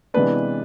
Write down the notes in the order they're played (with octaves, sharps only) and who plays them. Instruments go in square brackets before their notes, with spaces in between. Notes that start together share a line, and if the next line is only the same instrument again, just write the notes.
[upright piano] C3 E3 G#3 B3 D4 B4